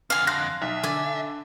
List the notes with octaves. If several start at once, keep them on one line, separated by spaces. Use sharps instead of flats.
F2 D3 F5 G#5
F5 C6 F#6 A#6
B1 E5
D3 D5 G#5